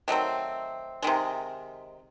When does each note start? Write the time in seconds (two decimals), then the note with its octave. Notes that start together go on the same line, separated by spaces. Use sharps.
0.08 D#3 F#3 A3 C4
1.02 C3 D#3 G#3